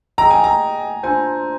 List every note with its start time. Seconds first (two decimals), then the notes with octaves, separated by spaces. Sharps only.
0.18 G#4 D#5 G5 A#5
0.31 G#5
0.44 A#5
1.03 D4 F4 C5 G#5